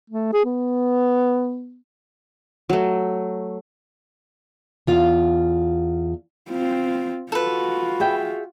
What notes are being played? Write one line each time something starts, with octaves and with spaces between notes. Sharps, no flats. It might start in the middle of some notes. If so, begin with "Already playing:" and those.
A3
G#4
B3
F#3 A3
E2 F4 F5
C4 F4
F4 F#4 A4 B4
G#4 E5 G5